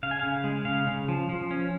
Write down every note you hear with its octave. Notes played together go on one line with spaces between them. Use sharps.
C#3 F5
G#5
C#3 F5
G#3
C#3 F5
C#3
F3
F3
C#4